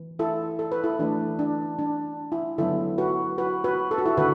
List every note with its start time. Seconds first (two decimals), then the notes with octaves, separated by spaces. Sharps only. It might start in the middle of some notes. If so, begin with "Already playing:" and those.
Already playing: E3
0.19 E4 A4
0.59 A4
0.72 B4
0.84 E4 A4
0.99 E3 A3 D4
1.39 D4
1.79 D4
2.32 E4
2.58 D3 F#3 B3 E4 A4
2.98 F#4 B4
3.38 F#4 B4
3.64 F#4 B4
3.91 A4
3.98 F#4
4.06 E4 A4
4.17 D3 F#4 B4